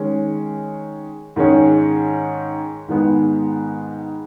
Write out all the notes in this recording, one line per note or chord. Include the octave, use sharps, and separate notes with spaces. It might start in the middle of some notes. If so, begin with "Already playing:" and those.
Already playing: D#3 G#3 C#4
G#2 D#3 G#3 C#4
G#2 D#3 G#3 B3